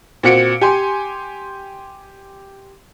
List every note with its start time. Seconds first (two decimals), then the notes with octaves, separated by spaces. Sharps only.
0.23 A#2 C4 F#4 C#7 D7
0.61 G4 G#5 C6